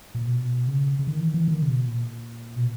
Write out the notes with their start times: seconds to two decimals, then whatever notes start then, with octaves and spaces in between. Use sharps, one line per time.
0.15 A#2
0.27 B2
0.67 C#3
0.99 C#3
1.07 D#3
1.20 E3
1.28 D#3
1.34 E3
1.48 D#3
1.62 C#3
1.67 B2
1.87 A#2
2.56 B2